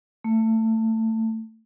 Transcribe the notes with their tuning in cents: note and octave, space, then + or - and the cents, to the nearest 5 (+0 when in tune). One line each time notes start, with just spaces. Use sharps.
A3 +20